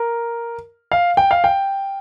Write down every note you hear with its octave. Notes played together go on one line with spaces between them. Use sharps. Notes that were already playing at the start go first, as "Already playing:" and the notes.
Already playing: A#4
F5
G5
F5
G5